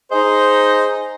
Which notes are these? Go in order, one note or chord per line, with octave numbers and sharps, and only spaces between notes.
D#4 G#4 C5 D#5